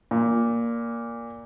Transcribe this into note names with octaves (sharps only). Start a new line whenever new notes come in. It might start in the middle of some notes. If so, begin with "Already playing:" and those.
A#2